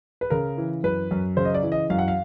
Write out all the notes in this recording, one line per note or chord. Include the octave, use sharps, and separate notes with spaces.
B4
C#3 A#4
E3
F#2 B4
F#2
C#3 C5
D#5
D5
E3
D#5
F#2 F5
F#5
F5